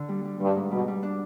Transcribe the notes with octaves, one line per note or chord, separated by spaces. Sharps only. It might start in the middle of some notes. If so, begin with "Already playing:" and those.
Already playing: D3
G3
G3
G2 G3
G#2
B2 G3
G3
D4